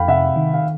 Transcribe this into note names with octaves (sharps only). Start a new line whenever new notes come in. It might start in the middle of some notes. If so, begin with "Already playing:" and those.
Already playing: F2 F5 G5 B5
C3 E5 F#5
D#3
F5